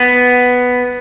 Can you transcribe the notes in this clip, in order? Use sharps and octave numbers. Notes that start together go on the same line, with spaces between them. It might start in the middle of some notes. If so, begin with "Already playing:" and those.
Already playing: B3